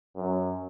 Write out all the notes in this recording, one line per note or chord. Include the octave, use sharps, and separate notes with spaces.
F#2